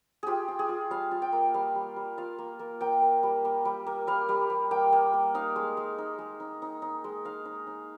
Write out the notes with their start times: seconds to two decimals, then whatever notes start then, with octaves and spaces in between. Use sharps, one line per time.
0.23 F4 G4 G#4
0.48 F4
0.59 G#4
0.69 F4
0.90 G3 F5
1.11 F4
1.22 G5
1.32 A#3
1.54 G3 F5
1.75 G3
1.96 G3
2.17 F4 F5
2.39 A#3
2.59 A#3
2.81 A#3 G5
3.02 A#3
3.23 G3
3.45 A#3
3.65 G3
3.87 A#3
4.07 G3 F5
4.29 G3
4.50 G3
4.71 A#3 G5
4.93 A#3
5.13 A#3
5.35 D#4 F5
5.56 G#3
5.77 G#3
5.98 D#4
6.19 G#3
6.40 D#4
6.62 D#4
6.82 D#4
7.04 G#3
7.25 D#4 F5
7.45 D#4
7.67 D#4